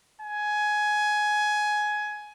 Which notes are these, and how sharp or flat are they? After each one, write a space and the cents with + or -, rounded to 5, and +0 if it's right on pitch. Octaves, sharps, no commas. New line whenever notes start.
G#5 +15